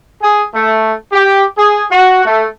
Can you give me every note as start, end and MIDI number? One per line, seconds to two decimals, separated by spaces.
0.21 0.42 68
0.54 0.91 57
1.12 1.42 67
1.58 1.82 68
1.91 2.22 66
2.25 2.45 57